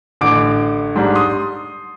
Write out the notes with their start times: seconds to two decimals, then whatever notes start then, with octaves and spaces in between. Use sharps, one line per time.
0.21 A1 D3 D6 D7
0.96 G#2 G3 D4
1.15 C6 D#6